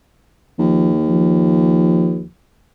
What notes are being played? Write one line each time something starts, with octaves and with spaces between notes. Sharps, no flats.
D#2 F3
F3